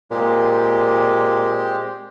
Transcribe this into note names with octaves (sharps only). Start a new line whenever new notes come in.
A#2 G#3 C4 G4